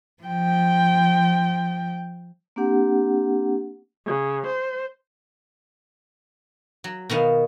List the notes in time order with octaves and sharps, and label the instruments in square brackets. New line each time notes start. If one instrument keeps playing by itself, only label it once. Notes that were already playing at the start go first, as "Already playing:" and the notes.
[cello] F3 G5
[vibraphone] A#3 C4 D4 G4 F#5
[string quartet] C#3
C5
[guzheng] F#3
B2 D#3 B3 F5